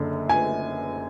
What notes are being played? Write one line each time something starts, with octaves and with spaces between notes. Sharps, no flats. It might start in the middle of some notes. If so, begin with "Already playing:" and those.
Already playing: F#1 F#2 D3
G#5